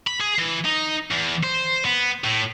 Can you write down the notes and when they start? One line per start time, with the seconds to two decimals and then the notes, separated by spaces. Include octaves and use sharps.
0.07 B5
0.20 G#4
0.39 E3
0.65 D#4
1.11 E2
1.43 C5
1.85 B3
2.24 A2